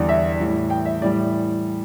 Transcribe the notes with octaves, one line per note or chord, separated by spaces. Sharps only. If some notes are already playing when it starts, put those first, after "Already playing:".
Already playing: E2 D3 G3 D5
E5
A2 E3 G3
G5
E5
A2 E3 G3 D5